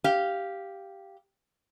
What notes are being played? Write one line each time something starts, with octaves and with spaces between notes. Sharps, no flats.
G4 F5